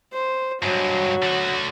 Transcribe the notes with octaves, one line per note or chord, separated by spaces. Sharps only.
C5
G2 F#3 G#3
D3 F#4